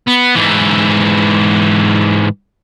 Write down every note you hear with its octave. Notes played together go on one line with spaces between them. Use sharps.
B3
G#2 E3